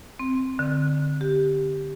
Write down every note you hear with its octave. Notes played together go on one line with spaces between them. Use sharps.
C4
D3
G4